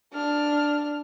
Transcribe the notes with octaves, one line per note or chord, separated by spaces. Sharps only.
D4 F6